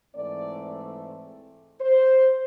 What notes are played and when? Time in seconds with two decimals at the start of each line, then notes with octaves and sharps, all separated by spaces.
0.14 G#2 E3 A3 C4 D5
1.80 C5